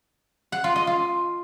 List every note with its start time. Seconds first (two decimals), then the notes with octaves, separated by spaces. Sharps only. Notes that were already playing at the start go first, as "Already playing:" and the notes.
0.52 F#5
0.64 F4
0.76 D#5
0.87 F4